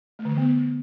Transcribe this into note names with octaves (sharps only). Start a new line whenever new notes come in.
A3
D3
E3
B3